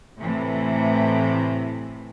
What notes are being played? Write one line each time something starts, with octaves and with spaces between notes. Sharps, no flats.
A2 C3 E3